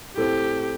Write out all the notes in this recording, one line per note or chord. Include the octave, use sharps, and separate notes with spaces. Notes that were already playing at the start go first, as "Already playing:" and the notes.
A2 A3 C4 G4